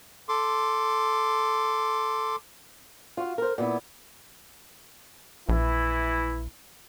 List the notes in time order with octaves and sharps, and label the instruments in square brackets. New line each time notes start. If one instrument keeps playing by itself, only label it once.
[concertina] A4 C6 D6
[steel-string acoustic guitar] F4 F#4
A#4 C5
A#2 B3 E4
[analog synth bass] A#1 [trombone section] E3 E4